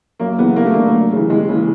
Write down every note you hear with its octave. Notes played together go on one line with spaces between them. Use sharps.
F#2 A#3
C#3 E3 B3
G2 A#3
A3
D3 A#3
F#2
C#3 E3
D#2 G#3
C#3 E3